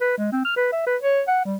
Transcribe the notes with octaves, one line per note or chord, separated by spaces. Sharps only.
B4
G#3
C4
F6
B4
E5
B4
C#5
F#5
G3